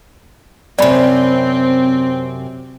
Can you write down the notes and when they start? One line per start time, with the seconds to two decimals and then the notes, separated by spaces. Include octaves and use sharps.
0.79 F#2 C3 C4 D5 B5